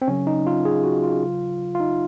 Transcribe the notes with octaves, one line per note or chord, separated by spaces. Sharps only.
C4
C#3 F#3 C#4
D#4
F4
G#4
F#4
F4
C#3 F#3
F4
D#4